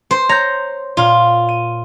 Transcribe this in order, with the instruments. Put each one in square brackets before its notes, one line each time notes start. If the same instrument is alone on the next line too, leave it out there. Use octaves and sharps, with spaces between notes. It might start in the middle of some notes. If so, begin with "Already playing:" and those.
[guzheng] C5
[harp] C#5 G6 [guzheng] A#5
[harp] A#2 [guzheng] F4
[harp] D#7